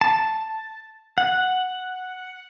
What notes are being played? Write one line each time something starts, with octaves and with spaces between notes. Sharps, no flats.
A5
F#5